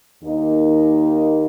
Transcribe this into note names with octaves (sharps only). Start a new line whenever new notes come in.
D#2 D#3 A#3 D#4